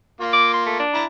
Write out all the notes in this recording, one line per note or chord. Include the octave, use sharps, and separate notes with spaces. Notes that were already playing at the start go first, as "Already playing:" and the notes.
A#3 F4
D6
C6
A3
D4
E4 A5 A#5